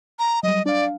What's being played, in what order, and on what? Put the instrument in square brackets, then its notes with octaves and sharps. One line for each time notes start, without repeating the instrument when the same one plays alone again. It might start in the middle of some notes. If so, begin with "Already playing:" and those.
[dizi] A#5
[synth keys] F#3 G3 [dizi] D#5
[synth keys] D4 F5 [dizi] D5